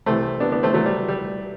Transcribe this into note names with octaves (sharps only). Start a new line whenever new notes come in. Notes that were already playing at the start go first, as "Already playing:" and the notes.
C2 C3 E3 A3 C4
B3 D4
B3 D4
A3 C4
F#3 A3
G3
G3